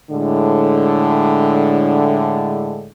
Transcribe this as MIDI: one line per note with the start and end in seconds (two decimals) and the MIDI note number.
0.11 2.90 45
0.11 2.90 50
0.11 2.90 56